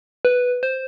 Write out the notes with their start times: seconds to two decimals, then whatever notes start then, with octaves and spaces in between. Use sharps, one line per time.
0.25 B4
0.63 C5